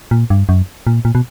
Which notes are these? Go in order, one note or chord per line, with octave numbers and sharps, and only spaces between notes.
A#2
G2
F#2
A#2
A#2
B2